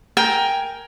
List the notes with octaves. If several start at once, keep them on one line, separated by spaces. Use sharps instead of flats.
A#4 G5 G#5